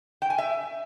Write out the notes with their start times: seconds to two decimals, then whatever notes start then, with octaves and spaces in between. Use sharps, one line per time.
0.22 G5
0.30 G#5
0.38 E5